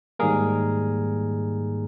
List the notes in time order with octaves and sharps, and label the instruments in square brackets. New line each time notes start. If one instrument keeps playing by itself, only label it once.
[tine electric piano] G#2 D#3 G3 A#3 G#4 A#4